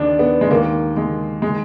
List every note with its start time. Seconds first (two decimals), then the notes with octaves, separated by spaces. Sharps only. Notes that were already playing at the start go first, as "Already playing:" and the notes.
Already playing: D#2 D#3 D4 D#4
0.19 B3
0.41 G#3
0.51 D#2 D#3 A#3
0.97 G#3
1.42 D#3 G#3